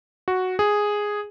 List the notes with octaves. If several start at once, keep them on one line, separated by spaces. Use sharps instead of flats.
F#4
G#4